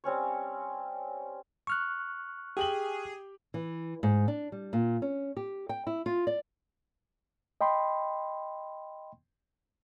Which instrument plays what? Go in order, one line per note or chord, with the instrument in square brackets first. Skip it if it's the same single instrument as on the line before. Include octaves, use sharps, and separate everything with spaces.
[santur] G3 C4 C#4 C#5
[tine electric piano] C#6 F6 F#6
[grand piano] G4 G5 F#7 [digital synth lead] G#4
[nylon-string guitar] E3
G#2
D4
G3
A#2
C#4
G4
G5
E4
F4
D5
[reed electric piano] D#5 G5 B5 C6